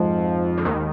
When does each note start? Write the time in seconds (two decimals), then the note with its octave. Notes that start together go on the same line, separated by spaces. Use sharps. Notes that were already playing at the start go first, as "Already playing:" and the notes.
Already playing: F2 G#2 F3
0.57 D3
0.65 D#2 D#3